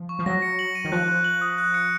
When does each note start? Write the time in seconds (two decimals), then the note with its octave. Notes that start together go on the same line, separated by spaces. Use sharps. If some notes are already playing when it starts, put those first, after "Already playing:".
Already playing: F3
0.09 C#6
0.19 F3
0.26 F#3 A#6
0.42 C#7
0.59 F#7
0.75 D#7
0.85 D#3
0.92 F3 F#6
1.08 F#6
1.24 F#7
1.41 D#6
1.58 F#6
1.74 C#7